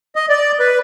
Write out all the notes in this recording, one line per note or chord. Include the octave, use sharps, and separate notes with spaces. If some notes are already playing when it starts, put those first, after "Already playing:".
D#5
D5
B4